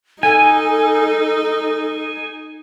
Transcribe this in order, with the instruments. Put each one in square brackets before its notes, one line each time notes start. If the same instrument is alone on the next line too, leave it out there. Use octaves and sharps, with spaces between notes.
[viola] D#4 [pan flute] A4 [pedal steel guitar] G#5